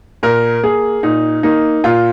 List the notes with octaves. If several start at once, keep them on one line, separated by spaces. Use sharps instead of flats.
A#2 A#4
A#3 G#4
A#2 D#4
A#3 D#4
A#2 F4